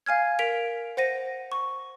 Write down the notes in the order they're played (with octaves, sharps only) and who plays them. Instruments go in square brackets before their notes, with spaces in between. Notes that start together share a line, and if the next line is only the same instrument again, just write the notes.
[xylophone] F5 G#5 F6 G#6
A#4 B6 D7 F7
C5 F#5 A#6 D#7
C#6